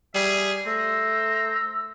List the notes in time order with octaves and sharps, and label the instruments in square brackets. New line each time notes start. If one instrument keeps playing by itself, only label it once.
[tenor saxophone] G3 [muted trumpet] G#4 [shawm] E5
[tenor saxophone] A3 [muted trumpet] C5 [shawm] A#5 [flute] E6